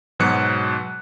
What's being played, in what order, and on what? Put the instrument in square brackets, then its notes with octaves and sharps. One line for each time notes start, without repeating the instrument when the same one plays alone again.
[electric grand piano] G#2 B2 F#3 B3 F#6 C#7